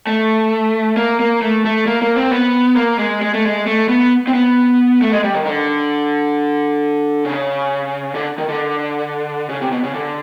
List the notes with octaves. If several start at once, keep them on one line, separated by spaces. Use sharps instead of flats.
A3
A#3
A#3
A3
A3
A#3
A#3
C4
B3
A#3
G#3
G#3
A3
G#3
A3
B3
C4
B3
A3
G#3
G3
D#3
D3
C#3
D3
D#3
D3
C#3
C3
B2
C#3
D3